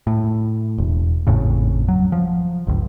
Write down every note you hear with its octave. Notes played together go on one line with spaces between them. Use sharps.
A2
E1
G#1 F2 A2 C#3
F#3
F3
G1 C#2